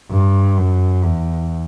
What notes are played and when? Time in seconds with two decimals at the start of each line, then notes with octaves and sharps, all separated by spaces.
0.11 G2
0.58 F#2
1.04 E2